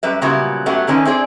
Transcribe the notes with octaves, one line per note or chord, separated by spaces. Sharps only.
F#2 G3 B4 E5
A#2 C#3 F#3 G3 B3 E4
F#2 F#3 A3 B3 G4
D3 D#3 C#4 E4 B4
C4 E4 G#4 D5